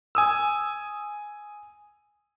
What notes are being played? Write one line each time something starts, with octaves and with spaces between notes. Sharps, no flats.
G#5 D#6 E6